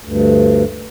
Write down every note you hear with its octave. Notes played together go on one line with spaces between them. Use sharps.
D2 G2